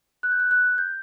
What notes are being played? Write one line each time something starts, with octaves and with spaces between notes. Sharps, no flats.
F#6
G6
F#6
F#6
G6